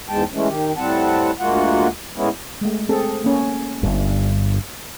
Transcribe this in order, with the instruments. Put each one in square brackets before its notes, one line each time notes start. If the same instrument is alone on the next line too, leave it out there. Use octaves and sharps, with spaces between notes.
[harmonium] E2 G#2 G#3 G5 A5
E3 G#3 A3 C#4
D#3 G4
A2 G3 C4 F#5 A5
D2 G#3 A#3 F4 F#4 F#5
A2 G#3 B3 C#4 E4
[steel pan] G#3 A3
C4 G#4 A4
A#3 C#4
[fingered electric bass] G1 G2